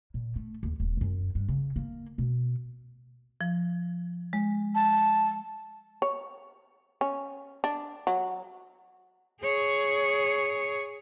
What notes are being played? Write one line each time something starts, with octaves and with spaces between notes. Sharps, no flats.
A#2
A3
D#2
D#1
F#2
G2
C#3
A#3
B2
F3
G#3
A5
C#5
C#4
D4
F#3
G#4 C#5